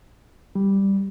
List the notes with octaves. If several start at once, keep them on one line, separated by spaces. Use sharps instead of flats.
G3